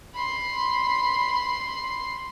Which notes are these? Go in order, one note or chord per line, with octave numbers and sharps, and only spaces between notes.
B5 C6